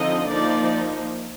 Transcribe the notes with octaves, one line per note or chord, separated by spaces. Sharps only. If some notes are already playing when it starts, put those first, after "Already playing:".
Already playing: D3 F3 C4 D#4 D#5
F3 A#3 D#4 D5